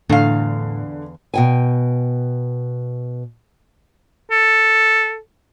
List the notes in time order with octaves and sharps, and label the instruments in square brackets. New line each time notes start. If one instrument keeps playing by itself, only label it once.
[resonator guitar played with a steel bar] E2 F5 [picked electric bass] A2 [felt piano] D3
[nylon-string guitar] B2 G5 G#5
[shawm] A4